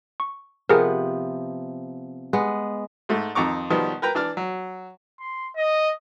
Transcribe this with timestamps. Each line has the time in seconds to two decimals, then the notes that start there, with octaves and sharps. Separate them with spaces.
0.20 C#6
0.69 C3 F3 B3 G#4 A#4
2.33 G#3 B3
3.09 G#2 A3
3.35 F2 D#3 A#5 C#6 D6
3.70 B2 D#3 F3 G3 B3
4.02 A#4 B4 G5 A#5
4.15 E3 D4 D5 F6
4.37 F#3
5.20 C6
5.57 D#5